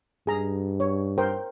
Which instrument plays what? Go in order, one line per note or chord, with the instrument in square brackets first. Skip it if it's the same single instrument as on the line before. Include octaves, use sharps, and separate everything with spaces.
[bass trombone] G2 [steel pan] G#4 A#5
[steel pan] C#5
A#4 C5 G5